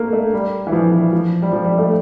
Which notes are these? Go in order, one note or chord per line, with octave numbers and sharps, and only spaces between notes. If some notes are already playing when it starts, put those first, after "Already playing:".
Already playing: A3 A#3
A3
G3
E3
F3
E3
F3
G3
F3
G3
A3